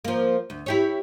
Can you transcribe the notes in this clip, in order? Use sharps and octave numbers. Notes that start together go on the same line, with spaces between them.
F3 A#3
D2
E4 G4 C#5